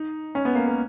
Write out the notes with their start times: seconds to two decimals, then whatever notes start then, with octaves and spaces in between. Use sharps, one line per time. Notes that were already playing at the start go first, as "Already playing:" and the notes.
Already playing: D#4
0.35 C#4
0.45 B3
0.55 A#3
0.66 A#3